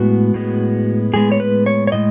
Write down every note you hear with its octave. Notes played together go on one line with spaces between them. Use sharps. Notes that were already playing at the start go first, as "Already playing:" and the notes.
Already playing: A2 G#3 B3 F#4
A2 G#3 B3
A2 G#3 B3 G#4
C#5
B4
C#5
C#5
A2 G#3 D#5